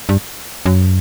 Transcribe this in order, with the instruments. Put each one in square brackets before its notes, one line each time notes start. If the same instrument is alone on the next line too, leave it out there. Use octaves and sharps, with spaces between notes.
[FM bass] G2
F#2